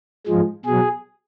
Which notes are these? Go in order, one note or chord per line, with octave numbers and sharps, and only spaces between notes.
G#2 F3 G#3
B2 F#3 G#4